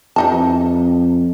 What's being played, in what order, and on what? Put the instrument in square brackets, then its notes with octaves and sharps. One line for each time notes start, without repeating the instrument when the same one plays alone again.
[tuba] F2 [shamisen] E3 D#4 A5